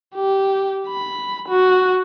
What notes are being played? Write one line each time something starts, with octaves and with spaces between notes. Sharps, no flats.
G4
B5
F#4